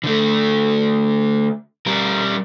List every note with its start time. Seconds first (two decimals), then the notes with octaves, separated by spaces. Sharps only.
0.04 D3 A3
1.87 G3 A#4